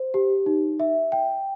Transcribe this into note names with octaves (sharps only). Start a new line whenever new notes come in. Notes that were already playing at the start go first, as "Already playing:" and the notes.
Already playing: C5
G4
D#4
E5
G5